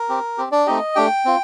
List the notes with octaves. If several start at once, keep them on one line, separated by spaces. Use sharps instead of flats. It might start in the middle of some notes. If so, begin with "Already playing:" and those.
Already playing: A#4
C4 G4
C4 G4
D4 D5
A3 C4 D#4 G4 D#5
A3 D4 G4 G5
C4 F4